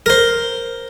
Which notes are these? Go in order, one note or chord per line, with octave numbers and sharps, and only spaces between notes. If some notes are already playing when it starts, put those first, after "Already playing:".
A#4 C5